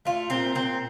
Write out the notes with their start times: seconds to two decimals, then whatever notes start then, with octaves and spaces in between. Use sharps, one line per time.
0.05 A3 F4
0.30 A#2 C4
0.55 A#2 C4